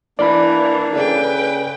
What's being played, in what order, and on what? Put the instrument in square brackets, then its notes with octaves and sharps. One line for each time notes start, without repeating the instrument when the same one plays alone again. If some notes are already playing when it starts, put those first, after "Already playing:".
[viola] E3 [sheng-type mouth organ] A#3 D4 [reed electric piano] D5 B5
[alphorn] C#3 [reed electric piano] A4 D5 [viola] B4 G5